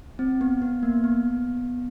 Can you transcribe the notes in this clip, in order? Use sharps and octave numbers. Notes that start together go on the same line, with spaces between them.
C4
B3
B3
A#3
B3